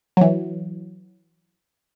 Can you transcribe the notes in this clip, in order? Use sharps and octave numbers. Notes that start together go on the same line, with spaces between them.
E3 F#3